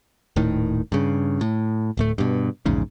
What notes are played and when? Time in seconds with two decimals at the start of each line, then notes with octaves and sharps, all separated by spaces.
0.36 D#1 A2 D#3
0.92 G2 C#3
1.41 A2
1.97 D1 A2 A3
2.18 G2 B2
2.66 A#1 E2 G#2 C#3